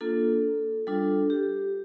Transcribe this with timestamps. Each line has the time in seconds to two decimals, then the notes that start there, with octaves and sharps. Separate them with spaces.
0.01 A#3 D4 F4 A4
0.87 G3 D4 F4 A4
1.30 G4